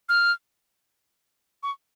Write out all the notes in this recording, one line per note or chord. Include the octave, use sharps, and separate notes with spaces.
F6
C#6